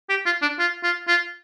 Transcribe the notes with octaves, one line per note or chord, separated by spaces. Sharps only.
G4
F4
D4
F4
F4
F4